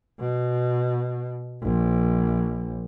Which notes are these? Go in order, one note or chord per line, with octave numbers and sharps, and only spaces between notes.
B2
A#1